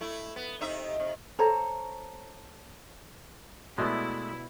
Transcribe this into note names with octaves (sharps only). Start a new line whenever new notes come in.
A3 E4
B3
C3 D#4 E5
C3
A4 C5 C#5 A#5
B2 G#3 A3 B3 E4 D5 E5